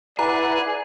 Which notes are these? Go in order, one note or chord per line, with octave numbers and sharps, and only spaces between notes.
E4 G#4 B4 D5 F#5 A#5